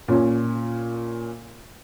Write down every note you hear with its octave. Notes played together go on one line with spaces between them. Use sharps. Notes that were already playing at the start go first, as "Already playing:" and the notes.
A#2 C#4